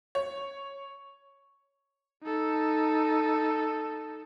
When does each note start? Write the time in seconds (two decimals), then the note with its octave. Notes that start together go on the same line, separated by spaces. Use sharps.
0.15 C#5
2.23 D#4 A4